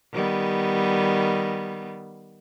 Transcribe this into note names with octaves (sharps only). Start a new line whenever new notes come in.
D#3 G3 B3